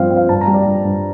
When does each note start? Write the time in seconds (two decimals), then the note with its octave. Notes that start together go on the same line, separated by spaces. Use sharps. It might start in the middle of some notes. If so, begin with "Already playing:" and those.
Already playing: G2 F3 C4 F5
0.10 C4
0.16 F5
0.29 G2 A5
0.41 A#5
0.48 G3
0.54 D5
0.66 G2
0.85 G2